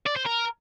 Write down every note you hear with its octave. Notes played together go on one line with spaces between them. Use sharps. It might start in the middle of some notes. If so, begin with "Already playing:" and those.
D5
C5
A#4